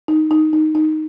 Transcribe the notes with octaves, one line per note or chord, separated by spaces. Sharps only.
D#4
D#4
D#4
D#4